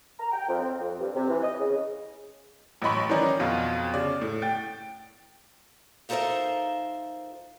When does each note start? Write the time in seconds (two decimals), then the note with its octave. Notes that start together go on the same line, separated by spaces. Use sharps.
0.19 A#5
0.32 G5
0.48 F2
0.60 C4
0.80 F2
1.00 G2
1.15 C3
1.29 E3
1.43 D#5
1.59 C#3
2.82 A1 F#3 D#5 B5 C#6
3.09 D#3 E3 F#3 C#4 D#4 D5
3.40 F2 B2 F4
3.94 C#3 D5
4.21 A2
4.42 G5 A6
6.09 F3 D#4 A4 A#4 C5 E5